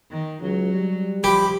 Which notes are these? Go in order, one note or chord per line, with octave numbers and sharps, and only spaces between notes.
D#3
C#2 F#3
G3
F3 G4 B5